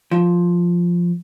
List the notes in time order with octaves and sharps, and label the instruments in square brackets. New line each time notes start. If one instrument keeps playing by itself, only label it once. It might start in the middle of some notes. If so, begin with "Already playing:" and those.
[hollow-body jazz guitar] F3